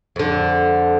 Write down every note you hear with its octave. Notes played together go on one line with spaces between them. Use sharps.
F2 D3